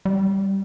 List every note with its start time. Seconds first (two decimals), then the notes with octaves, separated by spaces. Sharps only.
0.05 G3